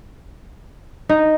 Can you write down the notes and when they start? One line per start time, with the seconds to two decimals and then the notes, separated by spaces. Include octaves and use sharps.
1.09 D#4